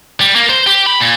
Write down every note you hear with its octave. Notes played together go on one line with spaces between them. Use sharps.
G3
A#3
C5
G4
B5
A#2